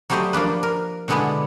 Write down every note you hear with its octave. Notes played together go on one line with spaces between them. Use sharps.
F#3 G3 A3 G4 C5 D#5
F3 A#3 D4 B4
A#4
B2 D3 G#3 B3 D4 E4